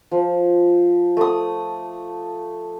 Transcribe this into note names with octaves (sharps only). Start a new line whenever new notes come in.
F3
A3 D#6